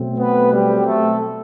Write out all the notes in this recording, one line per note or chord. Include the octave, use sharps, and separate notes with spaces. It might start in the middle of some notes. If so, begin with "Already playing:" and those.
Already playing: B2 F#3 A3 C4
B3 B4
G3 G4
A3 A4